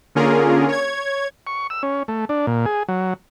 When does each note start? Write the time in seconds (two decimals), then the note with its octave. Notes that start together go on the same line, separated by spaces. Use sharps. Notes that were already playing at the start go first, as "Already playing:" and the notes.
0.15 D3 A#3 C#4 F4 G#4 A#4
0.68 C#5 G#6
1.47 C#6
1.70 E6
1.83 C#4
2.08 A3
2.29 D4
2.47 A#2
2.66 G#4
2.88 F#3